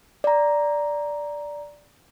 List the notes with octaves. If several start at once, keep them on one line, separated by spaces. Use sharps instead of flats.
D5 A#5